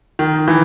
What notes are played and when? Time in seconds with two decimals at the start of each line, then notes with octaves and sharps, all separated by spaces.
0.19 D#3
0.48 E3